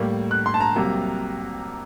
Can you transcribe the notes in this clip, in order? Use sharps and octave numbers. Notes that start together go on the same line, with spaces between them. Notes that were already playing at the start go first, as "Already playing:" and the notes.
Already playing: A2 G3 A#3
F#6
C6
A5
A#5
C2 C3 F#3 A#3